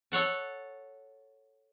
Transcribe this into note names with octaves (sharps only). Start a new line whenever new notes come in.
A4 C#5 F#5 A5